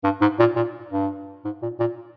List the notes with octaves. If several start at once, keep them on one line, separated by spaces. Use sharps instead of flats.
G2
G#2
A#2
A#2
G2
G#2
A#2
A#2